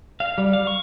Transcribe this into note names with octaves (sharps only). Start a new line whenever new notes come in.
F5
G3
F5
C#6